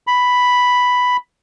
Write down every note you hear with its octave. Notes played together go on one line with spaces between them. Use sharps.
B5